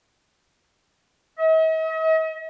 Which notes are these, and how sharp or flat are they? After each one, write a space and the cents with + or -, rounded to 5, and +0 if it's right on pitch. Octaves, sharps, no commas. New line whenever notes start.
D#5 +45